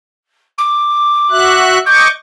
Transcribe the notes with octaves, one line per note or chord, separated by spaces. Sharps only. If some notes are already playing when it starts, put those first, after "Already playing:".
D6
F#4 E5 F#6
D#5 C#6 D6 G6